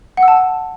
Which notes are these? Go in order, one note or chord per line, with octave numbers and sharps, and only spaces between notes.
F#5
E6
A5